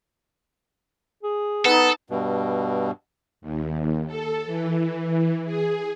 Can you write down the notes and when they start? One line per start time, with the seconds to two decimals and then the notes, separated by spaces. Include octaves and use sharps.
1.23 G#4
1.65 B3 D#4 A4
2.10 G2 B2
3.41 D#2
4.07 A4
4.46 E3
5.45 G#4